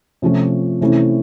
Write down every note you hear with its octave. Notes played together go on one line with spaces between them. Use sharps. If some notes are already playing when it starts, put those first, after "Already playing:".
C3 F3 A3 C#4 F4
C3 E3 A3 C#4 E4